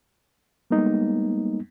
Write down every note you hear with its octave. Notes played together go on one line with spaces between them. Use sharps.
G3 G#3 A#3 B3 D#4